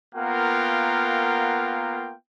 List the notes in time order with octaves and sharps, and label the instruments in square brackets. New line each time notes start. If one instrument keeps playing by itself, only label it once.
[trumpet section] A#3 B3 F4 A#4 F#5 G5